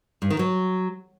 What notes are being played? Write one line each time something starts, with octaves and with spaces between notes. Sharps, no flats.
G2
D#3
F#3